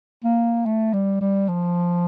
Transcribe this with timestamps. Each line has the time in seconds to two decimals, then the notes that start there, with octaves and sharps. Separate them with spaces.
0.24 A#3
0.66 A3
0.94 G3
1.21 G3
1.49 F3